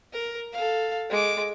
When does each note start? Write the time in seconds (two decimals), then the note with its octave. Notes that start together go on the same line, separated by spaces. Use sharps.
0.13 A#4
0.53 A4 F5
1.10 G#3 D6